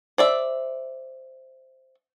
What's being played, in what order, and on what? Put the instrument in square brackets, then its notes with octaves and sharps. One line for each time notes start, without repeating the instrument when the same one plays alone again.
[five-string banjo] C5 D5 E5